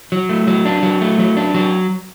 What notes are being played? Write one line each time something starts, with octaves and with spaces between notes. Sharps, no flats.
F#3
A3
F#3
D4
F#3
A3
F#3
D4
F#3